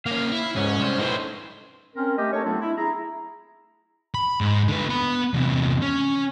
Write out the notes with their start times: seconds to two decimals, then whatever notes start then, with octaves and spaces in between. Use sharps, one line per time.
0.06 A#3 C#4 F5
0.32 E4
0.56 C#2 G#2 C#4
0.78 C2 C5
0.99 A2 D#4 B4 C5
1.95 C4 C#4 A#4
2.18 A3 G4 D#5
2.32 D4 A4 A#4 C#5
2.44 F#3 A3 B3 C4 D4 F4
2.60 E4
2.77 E4 G#4 A#5
4.14 B5
4.41 G#2
4.68 D3 B4
4.89 B3 B5
5.34 E2 C3
5.82 C#4